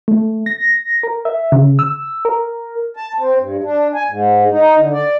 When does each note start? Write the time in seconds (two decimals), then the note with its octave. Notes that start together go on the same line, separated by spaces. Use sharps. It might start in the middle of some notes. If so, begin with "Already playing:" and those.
0.08 A3
0.46 A#6
1.03 A#4
1.25 E5
1.52 C#3
1.79 E6
2.25 A#4
2.96 A5
3.19 C4
3.38 G2
3.64 D4
3.95 G#5
4.09 G#2
4.51 D#4
4.77 D3
4.93 D5